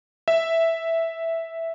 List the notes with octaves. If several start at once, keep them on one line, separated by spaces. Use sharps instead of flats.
E5